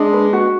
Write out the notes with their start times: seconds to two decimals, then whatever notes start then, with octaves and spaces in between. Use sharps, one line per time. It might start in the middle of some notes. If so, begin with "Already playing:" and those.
Already playing: G#3 D4
0.13 B4
0.33 F#4